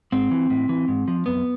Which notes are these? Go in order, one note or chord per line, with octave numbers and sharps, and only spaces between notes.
G#2 C4
E3
A2
E3
G#2
F3
F#2 B3